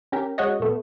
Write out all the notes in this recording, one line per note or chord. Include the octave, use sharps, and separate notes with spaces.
C#4 G4 A#4
G#3 C#4 F#4 C#5 D#5
A#2 A3 B3